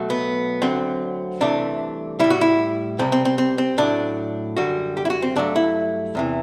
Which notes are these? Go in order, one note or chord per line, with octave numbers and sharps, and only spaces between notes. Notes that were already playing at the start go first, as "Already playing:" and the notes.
Already playing: B1 B2 F#3 A3
B3
D2 D3 F#3 C4
C2 C3 E3 A3 D4
A2 G3 E4
F#4
E4
C2 C3 G3 C4
C4
C4
C4
C4
A2 F#3 A3 D4
F#2 D3 G3 F#4
G4
E4
F#4
C4
G2 F#3 A3 D4
E4
E2 C3 E3